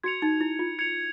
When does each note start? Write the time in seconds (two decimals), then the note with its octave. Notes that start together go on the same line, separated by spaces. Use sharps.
0.04 F#4 G#6 C#7 F7
0.22 D#4
0.41 E4
0.59 F4
0.79 G#6 C#7 F7